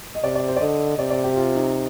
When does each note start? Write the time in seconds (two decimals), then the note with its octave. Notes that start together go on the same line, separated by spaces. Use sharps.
0.15 D#5
0.23 C3 D5
0.36 D5
0.48 C5
0.56 D5
0.60 D3 D#5
0.99 C3 D5
1.11 D5
1.24 G4
1.36 F4
1.55 D#4